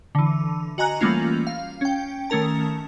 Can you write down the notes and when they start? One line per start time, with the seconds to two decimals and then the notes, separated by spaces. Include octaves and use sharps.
0.15 D3 E3
0.78 F#4 D#5 G#5 A#5 F#6 F#7
1.01 E3 G3 A3 A#3 C#4 F4
1.47 F5
1.81 C#4 G5
2.30 D#3 A3 C#4 A#4 A5